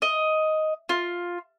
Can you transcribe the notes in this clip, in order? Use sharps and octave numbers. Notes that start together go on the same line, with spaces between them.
D#5
F4